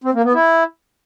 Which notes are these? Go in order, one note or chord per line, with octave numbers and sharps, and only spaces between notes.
C4
A#3
B3
E4